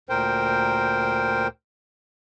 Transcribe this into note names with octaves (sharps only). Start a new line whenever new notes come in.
D2 A#2 A#4 C5 G5